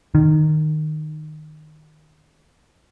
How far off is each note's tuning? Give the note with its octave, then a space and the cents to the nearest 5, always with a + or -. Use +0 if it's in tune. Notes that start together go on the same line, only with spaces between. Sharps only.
D#3 -15